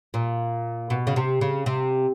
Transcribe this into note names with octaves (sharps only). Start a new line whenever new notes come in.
A#2
B2
C#3
C3
C#3
C3